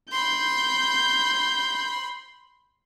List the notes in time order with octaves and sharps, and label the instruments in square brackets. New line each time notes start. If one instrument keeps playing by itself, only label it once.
[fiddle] B5 C6 [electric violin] G6